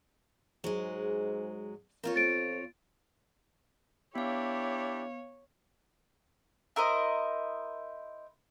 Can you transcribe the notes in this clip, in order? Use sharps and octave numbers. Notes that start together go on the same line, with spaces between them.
G#2 F#3 G#3
A#3 C4 F4 C#5
F2 A6 D7
B3 D4 E4 G4 C#5 F5
E4 A#4 C5 D#5